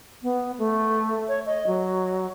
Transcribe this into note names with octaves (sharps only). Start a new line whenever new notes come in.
B3
A3
C#5
D#5
F#3